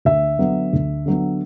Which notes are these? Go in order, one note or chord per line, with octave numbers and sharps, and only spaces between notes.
D2 E5
D3 F#3 B3
D2
D3 F#3 B3